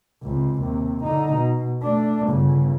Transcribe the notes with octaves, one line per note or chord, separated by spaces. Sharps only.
C#2 C3
D#2 C3
D3 D#4
B2
A3 D4
G1 C#3